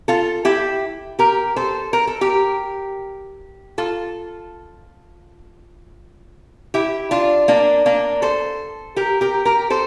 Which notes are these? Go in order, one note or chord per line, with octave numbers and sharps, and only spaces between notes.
F4 A4
E4 G4
G4 A#4
A4 C5
A#4
A4
G4 A#4
F4 A4
E4 G4
D4 F4
A#3 D4
A#3 D4
A4 C5
G4 A#4
G4 A#4
G4 A#4
A4 C5